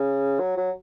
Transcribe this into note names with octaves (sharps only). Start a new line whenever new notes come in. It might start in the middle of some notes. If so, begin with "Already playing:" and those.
Already playing: C#3
F#3
F#3